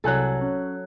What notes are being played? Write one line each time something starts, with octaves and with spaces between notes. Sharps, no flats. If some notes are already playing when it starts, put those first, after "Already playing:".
C2 F#3 A4 G#5 F#6
C#4